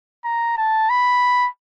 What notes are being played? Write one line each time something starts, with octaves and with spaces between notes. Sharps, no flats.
A#5
A5
B5